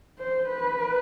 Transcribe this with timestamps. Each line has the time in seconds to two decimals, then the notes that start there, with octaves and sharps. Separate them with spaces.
0.19 C5
0.48 B4